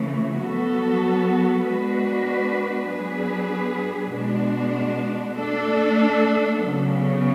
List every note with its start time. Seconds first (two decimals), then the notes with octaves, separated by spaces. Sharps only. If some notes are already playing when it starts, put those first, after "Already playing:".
Already playing: C#3 E3 A3
0.39 F#3 B3 F#4 A4
1.64 G#3 B3 D4 F#4 B4
2.89 F#3 B3 D4 G#4 B4
4.13 B2 G#3 B3 D4
5.39 A3 D4 A4
6.64 C#3 F#3 B3